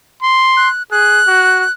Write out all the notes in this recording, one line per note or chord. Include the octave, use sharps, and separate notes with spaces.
C6
F#6
G#4 F#6
F#4